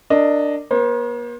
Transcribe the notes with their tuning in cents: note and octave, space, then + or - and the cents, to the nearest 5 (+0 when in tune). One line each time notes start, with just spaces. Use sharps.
D4 +5 A#4 -30 D#5 +0
A#3 +45 C5 +30